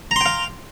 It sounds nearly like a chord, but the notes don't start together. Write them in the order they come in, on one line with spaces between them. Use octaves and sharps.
A#5 C6 G5 F5